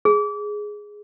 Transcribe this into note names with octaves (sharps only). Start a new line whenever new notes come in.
G#4